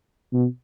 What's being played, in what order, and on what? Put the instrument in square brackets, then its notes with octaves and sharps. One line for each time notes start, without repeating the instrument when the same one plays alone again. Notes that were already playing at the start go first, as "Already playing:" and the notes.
[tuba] B2